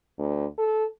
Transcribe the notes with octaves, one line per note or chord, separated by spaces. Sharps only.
D2
A4